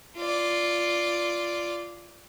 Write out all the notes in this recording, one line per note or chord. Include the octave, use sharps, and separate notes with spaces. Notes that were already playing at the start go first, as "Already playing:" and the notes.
F4 D5